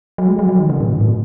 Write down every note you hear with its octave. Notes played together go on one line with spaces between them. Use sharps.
F#3
G#3
F#3
F#3
D#3
C#3
A2
G#2
A2